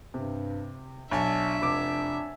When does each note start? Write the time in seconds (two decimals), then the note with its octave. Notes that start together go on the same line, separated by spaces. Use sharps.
0.14 G2 C3
1.11 B1 D4 C#5 E5 G#5 A5
1.62 F1 D6